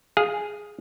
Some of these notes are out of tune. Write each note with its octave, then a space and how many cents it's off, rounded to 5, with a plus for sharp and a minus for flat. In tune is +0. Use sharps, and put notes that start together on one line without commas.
G#4 +0 F5 +20